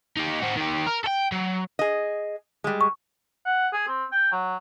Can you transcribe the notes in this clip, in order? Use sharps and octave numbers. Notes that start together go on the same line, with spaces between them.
D#4 G4
C4 F#4
D#3 G4
A#4
A4 G5
F#3
G#4 D#5
G3 G#3
C#6
F#5
G#4
C4
G5
F#3